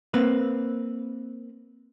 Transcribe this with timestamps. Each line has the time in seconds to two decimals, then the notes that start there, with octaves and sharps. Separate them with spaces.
0.14 A#3 C4 B4